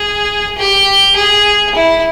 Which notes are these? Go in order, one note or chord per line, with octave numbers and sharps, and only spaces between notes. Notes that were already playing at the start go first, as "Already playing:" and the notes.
Already playing: G#4
G4
G#4
E4